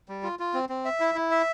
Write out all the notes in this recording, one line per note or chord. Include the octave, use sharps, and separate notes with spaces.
G3
F4
F4
C4
C4
E5
E4
E4
E5